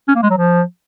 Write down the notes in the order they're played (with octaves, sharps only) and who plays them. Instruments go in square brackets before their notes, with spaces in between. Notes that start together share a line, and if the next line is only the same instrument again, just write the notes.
[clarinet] C#4
A#3
G#3
F#3
F3